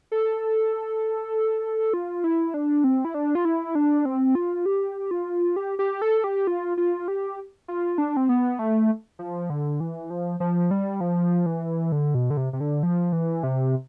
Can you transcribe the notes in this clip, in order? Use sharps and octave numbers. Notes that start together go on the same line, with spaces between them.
A4
F4
E4
D4
C4
E4
D4
F4
E4
D4
C4
F4
G4
F4
G4
G4
A4
G4
F4
F4
G4
F4
D4
C4
B3
A3
F3
D3
E3
F3
F3
G3
F3
E3
D3
B2
D3
C3
C3
D3
F3
E3
C3